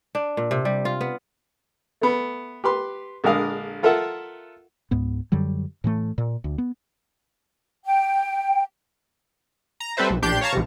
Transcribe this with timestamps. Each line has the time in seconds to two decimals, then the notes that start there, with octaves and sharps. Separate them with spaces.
0.15 D4
0.37 A#2
0.51 C3
0.65 G3
0.85 F4
1.01 B3
2.01 A3 B3
2.64 G4 B4 C6
3.24 A#1 D3 G#3 A#4 F5 D#6
3.83 F4 A4 A#4 E5 F#5
4.91 C#2 G#2 B3
5.32 F#2 D3 F#3 G3
5.84 A2 E3 A3
6.18 A#2
6.44 D2
6.58 B3
7.85 G5
9.80 A#5
9.97 G3 C4 A4 B4 C5 E5
10.10 B1
10.22 A#1 D4 G4 C6 G6
10.41 C#5 F5 A5 A#5 C#6
10.52 A#1 G#2 C3